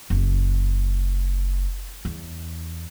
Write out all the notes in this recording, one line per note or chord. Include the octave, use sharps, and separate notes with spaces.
F#1
E2